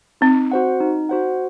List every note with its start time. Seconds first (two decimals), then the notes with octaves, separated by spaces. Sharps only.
0.21 C4 D#4
0.51 F#4 C5 F#5
0.80 D#4
1.09 F#4 C5 F#5